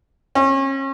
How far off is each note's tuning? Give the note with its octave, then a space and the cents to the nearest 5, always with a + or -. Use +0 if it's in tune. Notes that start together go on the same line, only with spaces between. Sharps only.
C#4 -35